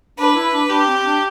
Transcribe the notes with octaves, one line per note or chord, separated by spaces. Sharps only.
D4 B4
E4
D4
D4 G4
C4
D4